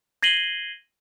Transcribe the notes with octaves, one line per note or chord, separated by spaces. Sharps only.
G#6 A#6 C7 D#7 F#7 G7